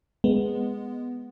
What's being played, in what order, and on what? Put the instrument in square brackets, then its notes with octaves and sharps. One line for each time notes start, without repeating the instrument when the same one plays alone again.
[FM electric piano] G#3 B3